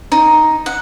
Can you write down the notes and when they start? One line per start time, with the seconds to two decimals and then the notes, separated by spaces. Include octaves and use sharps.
0.12 D#4
0.66 F#5